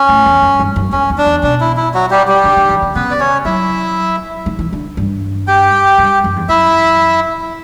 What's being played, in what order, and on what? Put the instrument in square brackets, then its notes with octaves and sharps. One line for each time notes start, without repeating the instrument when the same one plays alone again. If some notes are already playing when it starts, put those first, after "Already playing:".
Already playing: [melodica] C#4
[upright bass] A2
E2
F#2
G2
F#2
[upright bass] E2 [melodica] C#4
[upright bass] E2
[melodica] D4
[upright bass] E2
[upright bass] B2 [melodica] D4
[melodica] E4
E4
F#3 F#4
G3 G4
G3 G4
[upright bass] D3
D3
E3
D3
[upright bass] C#3 [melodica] B3 B4
[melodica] D5
C#4 C#5
[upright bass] F#3 [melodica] E4 E5
[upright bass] E3
E3
D3
G2
[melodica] G4 G5
[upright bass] G2
F#2
E2
[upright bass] F#2 [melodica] E4 E5